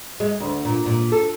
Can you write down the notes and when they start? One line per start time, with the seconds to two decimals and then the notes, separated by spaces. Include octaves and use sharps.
0.20 G#3
0.40 D2
0.65 A#2
0.86 A#2
1.12 A4